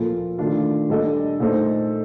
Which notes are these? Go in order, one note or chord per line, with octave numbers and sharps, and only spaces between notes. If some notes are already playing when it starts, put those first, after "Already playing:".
Already playing: A#2 F3 A#3 F4 A4
D#3 A3 D4 F4
A#2 G3 D4 A4 D#5
A#2 A3 D#4 A4 C5